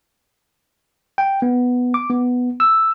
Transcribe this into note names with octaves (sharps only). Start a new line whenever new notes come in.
G5
B3
D6
B3
E6